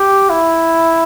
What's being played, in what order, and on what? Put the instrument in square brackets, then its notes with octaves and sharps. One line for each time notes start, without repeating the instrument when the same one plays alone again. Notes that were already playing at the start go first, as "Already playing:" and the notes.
Already playing: [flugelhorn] G4
E4